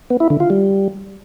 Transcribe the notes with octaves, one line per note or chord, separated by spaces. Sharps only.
B3
E4
D3
F4
G3